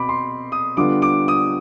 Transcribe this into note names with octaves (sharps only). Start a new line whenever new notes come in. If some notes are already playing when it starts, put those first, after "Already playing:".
Already playing: B2 C4 B5 D6
C6
D#6
D3 G3 B3 D4 F4 D6
D6
D#6